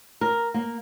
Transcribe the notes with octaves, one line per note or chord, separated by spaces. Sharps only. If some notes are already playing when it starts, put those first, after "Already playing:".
A#4
A#3